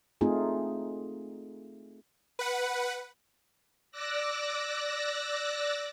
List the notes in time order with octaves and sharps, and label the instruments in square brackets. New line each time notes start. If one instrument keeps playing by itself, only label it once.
[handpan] A3 C4 D#4 F4 G#4
[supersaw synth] B4 F#5
[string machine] D5 D6 E6 F#6 A#6